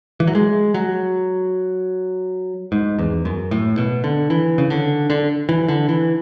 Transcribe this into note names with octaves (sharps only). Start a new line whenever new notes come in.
E3
F#3
G#3
F#3
G#2
E2
F#2
A2
B2
D3
E3
C#3
D3
D3
E3
D3
E3